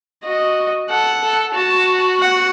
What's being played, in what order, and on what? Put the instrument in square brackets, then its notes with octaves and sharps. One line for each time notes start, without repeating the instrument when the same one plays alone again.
[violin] F#4 [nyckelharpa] D#5
[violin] A4 [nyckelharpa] F#5
[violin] A4
[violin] F#4 [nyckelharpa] A5
[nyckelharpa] F#5